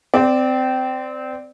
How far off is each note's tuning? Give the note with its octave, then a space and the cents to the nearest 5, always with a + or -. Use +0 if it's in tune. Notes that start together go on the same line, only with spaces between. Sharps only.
C4 -20 D5 +5